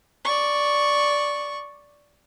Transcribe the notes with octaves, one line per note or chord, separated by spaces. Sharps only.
D5 C#6